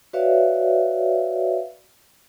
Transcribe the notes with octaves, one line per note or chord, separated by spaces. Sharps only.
F#4 B4 C#5 D5 E5 F5